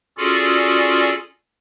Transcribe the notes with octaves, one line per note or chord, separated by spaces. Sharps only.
C#4 F4 F#4 G#4 A4 D5